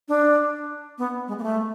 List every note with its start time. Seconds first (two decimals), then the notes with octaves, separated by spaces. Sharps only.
0.08 D4
0.98 B3
1.28 G#3
1.39 A#3
1.43 A3